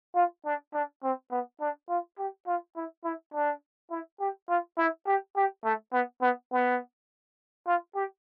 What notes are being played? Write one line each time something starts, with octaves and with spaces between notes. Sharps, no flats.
F4
D4
D4
C4
B3
D4
F4
G4
F4
E4
E4
D4
E4
G4
F4
E4
G4
G4
A3
B3
B3
B3
F4
G4